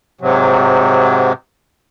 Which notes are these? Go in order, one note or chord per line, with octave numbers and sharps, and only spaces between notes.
G#2 C3 F#3